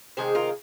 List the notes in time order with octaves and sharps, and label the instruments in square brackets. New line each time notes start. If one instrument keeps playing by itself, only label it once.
[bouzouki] C3 D#3 G#3 G#4 C5
F4 A#4